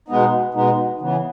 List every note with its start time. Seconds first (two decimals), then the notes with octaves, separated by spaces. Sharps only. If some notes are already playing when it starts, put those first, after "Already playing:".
0.08 B2 G#3 B3 D#4
0.54 B2 G#3 B3 D#4
1.00 C#3 E3 B3